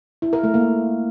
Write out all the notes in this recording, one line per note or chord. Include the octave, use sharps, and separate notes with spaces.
E4
A#4
A3
A#3